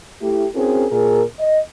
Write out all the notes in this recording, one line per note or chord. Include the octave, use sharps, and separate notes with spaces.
A3 E4 G4
C4 C#4 E4 F#4 G#4 A#4
A#2 G#4 A#4
D#5